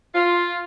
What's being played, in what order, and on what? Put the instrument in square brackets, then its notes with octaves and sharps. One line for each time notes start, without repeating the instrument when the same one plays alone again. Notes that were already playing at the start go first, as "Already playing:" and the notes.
[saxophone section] F4